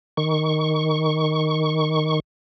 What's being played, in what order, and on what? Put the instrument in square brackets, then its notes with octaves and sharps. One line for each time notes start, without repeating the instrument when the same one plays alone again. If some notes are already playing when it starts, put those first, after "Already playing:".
[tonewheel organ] D#3 C#6